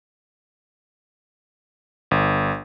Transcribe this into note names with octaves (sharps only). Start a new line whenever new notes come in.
G1